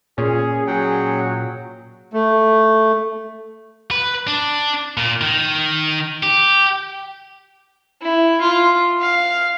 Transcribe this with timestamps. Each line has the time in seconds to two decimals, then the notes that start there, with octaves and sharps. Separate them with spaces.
0.18 A#2 C#4 G#4
0.67 F#3 G#4 F#5 G5
2.13 A3
3.91 B4
4.27 D4
4.97 A#2
5.21 D#3
6.23 G4
8.02 E4
8.41 F4
9.02 F5